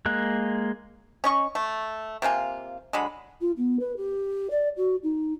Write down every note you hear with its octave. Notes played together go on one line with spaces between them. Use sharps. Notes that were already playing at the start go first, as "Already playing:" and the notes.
G#3 A#3 F#6
C#4 D#5 C#6
A3
C3 A#3 F4 G#5
D3 F#3 G#3 B5
F4
B3
B4
G4
D5
F#4
D#4